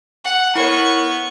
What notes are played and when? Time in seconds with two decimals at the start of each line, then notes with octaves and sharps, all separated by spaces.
0.24 F#5
0.55 B3 E4 A#4 C#5 C#6